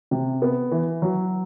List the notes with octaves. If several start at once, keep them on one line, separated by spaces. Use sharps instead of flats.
C3
B3
E3
F#3